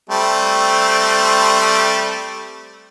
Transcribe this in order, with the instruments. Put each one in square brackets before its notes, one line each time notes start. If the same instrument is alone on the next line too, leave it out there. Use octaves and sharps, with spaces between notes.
[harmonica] G3 A3 C4